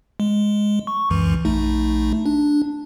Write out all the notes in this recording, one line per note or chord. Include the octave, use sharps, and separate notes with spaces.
G#3
C#6
C#2 F#2 E3
A#1 A3 D#4
D4